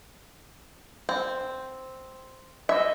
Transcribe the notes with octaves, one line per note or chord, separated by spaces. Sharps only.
C4
D#5 E5